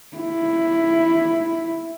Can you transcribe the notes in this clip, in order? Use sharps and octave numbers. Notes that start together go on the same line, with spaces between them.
E4